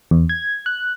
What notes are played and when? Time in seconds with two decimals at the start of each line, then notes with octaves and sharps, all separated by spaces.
0.11 E2
0.29 G#6
0.66 F#6